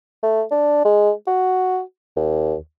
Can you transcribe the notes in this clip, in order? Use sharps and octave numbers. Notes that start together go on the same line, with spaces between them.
A3
D4
G#3
F#4
D#2